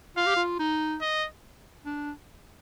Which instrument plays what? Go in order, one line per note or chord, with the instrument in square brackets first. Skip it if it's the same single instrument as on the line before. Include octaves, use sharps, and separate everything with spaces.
[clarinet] F4 [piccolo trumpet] F5
[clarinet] G4
F4
D#4
[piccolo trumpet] D#5
[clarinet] D4